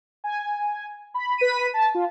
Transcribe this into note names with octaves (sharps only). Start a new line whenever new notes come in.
G#5
B5
B4 B6 D#7
A5
F4